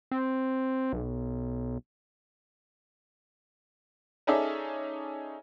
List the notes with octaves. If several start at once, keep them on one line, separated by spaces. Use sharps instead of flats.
C4
B1
C#4 D#4 G#4 A4 D5 E5